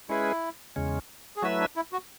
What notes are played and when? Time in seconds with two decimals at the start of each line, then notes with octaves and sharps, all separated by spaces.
0.09 G#3 C#4 E4 G#4 B4
0.76 E2 C#3 G#3 C#4
1.36 G#4
1.42 F#3 A3 E4 F#4 B4 E5
1.60 D4
1.76 E4
1.93 F#4